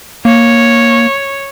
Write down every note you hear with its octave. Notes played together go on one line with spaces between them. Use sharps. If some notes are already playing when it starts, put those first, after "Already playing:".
A#3 C#5